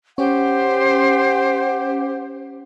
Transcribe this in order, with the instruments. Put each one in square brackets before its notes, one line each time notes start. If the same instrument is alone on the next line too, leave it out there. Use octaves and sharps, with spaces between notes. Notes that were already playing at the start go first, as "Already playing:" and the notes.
[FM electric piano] C#4 [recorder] G4 [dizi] C5 [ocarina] F#5